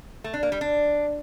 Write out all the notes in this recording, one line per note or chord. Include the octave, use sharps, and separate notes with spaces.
A3
D4
A#3
G3
D4